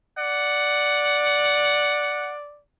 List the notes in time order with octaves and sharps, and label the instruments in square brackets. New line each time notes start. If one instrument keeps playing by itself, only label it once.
[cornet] D5 [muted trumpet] F#5